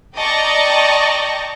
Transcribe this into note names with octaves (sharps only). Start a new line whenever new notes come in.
D5 D#5 G5 A5 A#5 C#6